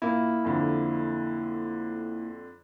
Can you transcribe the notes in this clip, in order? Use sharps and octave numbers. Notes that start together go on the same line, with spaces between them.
A#2 A#3 E4
F2 D3